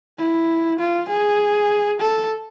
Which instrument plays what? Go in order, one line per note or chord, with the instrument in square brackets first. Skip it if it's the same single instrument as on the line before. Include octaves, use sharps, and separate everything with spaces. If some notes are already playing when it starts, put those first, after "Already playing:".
[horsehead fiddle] E4
F4
G#4
A4